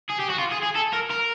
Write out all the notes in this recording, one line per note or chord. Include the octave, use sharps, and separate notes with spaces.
G#4
G4
F#4
F4
G#4
G#4
A4
A#4
A#4